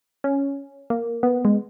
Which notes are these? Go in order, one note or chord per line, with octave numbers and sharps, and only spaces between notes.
C#4
A#3
B3
G#3